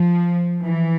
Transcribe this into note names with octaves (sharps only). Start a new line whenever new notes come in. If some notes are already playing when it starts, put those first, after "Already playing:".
Already playing: F3
E3